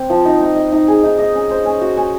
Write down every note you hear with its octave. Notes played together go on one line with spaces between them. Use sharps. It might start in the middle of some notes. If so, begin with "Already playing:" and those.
Already playing: C4
F3
D#4
D#4
D#5
D#4
G#4
D#4
D#5
C#4
C5
C#4
F#4
C#4